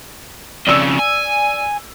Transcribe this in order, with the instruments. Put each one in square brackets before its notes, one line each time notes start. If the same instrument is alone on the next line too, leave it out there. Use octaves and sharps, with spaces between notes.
[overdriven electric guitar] F2 C#3 [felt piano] D5 E6
[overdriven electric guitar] G#5